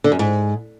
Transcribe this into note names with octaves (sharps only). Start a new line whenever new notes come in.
D3
F#2
G#2